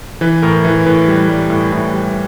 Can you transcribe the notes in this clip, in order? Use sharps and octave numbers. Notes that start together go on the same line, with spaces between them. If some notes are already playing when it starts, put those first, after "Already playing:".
E3 B4
A2 A#4
E3 B4
A2 B4
G3
G3
A2
A2
G3